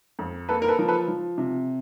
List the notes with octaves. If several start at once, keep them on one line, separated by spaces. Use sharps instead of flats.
F2
A#3 A4 B4
A#4
A4 B4
F3
A4 B4
F3
C3